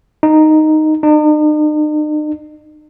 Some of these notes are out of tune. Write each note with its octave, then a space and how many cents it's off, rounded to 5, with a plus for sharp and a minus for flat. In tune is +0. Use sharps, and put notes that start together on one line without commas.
D#4 -5
D#4 -45